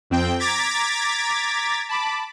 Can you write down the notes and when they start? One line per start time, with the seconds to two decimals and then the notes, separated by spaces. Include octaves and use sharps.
0.10 F2 C4 G5
0.40 A#5 D6 G#6 A6 B6
1.89 A5 B5 D6